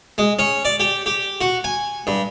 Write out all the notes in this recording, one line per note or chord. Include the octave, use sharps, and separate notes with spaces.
G#3
C#4
D5
G4
G4
F#4
G#5
G2